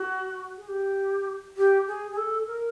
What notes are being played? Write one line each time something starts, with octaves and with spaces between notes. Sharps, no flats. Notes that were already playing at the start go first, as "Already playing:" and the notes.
Already playing: F#4
G#4
G4
G4
G#4
G#4
A4
A#4